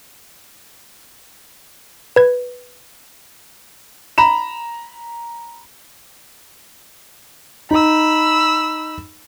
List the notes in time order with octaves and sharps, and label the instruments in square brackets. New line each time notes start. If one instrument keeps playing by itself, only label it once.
[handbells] B4 G#6
[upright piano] A#5 B5 E7
[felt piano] D#4 [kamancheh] B5 E6